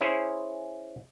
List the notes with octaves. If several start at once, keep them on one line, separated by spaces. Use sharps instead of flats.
C#4 E4 G#4 C5 C#5